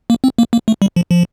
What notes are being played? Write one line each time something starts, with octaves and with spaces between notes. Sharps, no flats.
A#3
C4
A#3
A#3
A3
G3
F3
F3